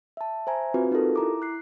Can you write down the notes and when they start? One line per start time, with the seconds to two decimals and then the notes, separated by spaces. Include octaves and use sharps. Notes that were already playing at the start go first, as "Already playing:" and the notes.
0.17 E5 A5
0.47 C5 E5 G#5 A#5
0.74 C4 F4 F#4 B4
0.91 D#4 F4 G4 A4 A#4
1.16 E4 A#5 D6
1.42 F#6 C7